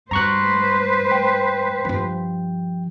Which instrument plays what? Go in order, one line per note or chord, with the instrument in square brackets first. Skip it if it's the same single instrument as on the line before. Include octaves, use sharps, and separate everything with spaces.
[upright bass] G2 [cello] B4 C5 [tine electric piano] A#5 C#6 F#6
[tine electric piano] G5
[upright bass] G2 F3